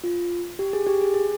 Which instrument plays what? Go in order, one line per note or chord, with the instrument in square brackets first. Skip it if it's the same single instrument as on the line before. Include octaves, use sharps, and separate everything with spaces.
[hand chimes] F4
G4
G#4
G4
G#4
G#4